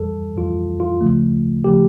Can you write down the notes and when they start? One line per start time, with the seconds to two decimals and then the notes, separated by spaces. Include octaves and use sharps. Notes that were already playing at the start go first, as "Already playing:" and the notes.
Already playing: F2 E3 G3 A4
0.37 F2 E3 G3 F4
0.80 F4
1.01 D2 C#3 F3 A3
1.64 C#3 F3 A3 G4